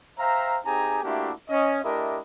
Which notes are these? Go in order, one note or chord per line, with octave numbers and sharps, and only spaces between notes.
C5 E5 F5 G5 A#5
C4 D#4 G4 G#4 G#5 A#5
A3 A#3 D4 E4 F#4 G4
C#4 D#5
A3 D4 E4 G4 A#4 D#5